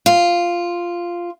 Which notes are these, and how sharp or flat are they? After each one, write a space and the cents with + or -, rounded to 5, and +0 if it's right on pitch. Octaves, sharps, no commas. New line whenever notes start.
F4 -5